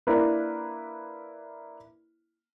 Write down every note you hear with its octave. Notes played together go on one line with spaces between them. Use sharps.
A#3 D4 E4 A#4 B4